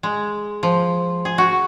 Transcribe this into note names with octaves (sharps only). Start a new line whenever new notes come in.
G#3
F3
G#4
F#4